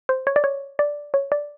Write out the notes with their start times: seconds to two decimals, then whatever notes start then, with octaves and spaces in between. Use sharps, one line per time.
0.09 C5
0.27 C#5
0.36 D5
0.44 C#5
0.79 D5
1.14 C#5
1.32 D5